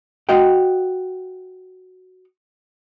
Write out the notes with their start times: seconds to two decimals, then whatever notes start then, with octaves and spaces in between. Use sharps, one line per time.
0.29 F#4 D#5 F5 G5